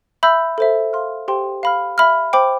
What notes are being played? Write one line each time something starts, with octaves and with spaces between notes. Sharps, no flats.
E5 B5 E6 G6
A4 C5 E5
F5 C6 F6
G4 C5 G5 C6
F5 B5 F6
E5 B5 F6
C5 G5 B5 D6